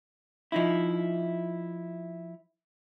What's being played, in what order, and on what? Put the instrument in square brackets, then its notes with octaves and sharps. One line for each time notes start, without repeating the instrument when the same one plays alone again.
[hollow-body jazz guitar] F3 D#4 E4